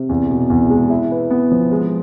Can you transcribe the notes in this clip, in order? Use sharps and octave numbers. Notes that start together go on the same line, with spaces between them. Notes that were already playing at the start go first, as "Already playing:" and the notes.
Already playing: C3
E2
B2
E2
G#3
E4
B4
B3
F3
G#3